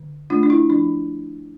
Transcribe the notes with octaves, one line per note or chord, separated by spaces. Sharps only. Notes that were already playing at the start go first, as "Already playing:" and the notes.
Already playing: D3
A3 D4 F4
D4
E4
F3 D4